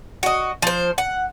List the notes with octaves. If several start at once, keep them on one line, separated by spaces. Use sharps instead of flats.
F#4 D#5
F3 C5
F#5